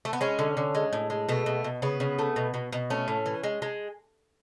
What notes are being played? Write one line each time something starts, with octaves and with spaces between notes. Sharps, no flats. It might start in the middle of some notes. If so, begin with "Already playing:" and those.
A3
B3
G#3 C#4
D3
D3
G#3
A2
G#3
B2 A3
B2
B2
C#3 B3
C#3
A3
B2
B2
B2
A3 C#4
A2
E3
G#3
G#3